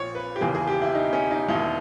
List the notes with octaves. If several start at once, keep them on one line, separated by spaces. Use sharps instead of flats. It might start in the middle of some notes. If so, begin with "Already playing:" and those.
Already playing: A#1 A#2 C#5
B4
G4
E1 D#2 C#3 E3 G#4
G#4
G4
E4
D#4
C#4
D#4
E1 D#2 D#3 E4